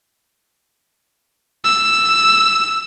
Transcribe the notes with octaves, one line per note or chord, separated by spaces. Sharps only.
E6